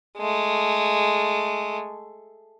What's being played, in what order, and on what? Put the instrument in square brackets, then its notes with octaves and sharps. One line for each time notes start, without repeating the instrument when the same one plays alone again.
[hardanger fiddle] G#3 A3